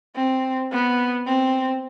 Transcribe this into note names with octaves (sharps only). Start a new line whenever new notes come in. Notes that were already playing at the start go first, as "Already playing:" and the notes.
C4
B3
C4